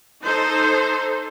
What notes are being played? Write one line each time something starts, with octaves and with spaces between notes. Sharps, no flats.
D#4 A4 C5